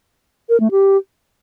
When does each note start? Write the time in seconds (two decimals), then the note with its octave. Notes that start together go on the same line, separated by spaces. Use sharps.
0.49 A#4
0.60 A3
0.71 G4